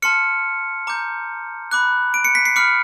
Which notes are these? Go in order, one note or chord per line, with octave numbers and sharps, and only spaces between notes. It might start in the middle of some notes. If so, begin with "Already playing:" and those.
A5 C6 F6 C#7
A#5 D6 G6
B5 D6 F#6
D7
C#7
B6
C7
B5 D6 F6 C#7